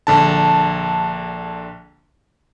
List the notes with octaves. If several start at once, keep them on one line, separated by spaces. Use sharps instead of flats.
A#1 D3 A5